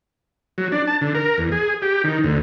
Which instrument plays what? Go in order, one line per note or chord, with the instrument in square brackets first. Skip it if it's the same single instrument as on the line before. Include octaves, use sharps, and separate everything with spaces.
[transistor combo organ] F#3
D4
A5
D3
A#4
E2
G#4
G4
D#3
D2